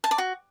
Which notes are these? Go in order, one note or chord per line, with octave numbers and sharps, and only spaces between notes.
A5
D5
F#4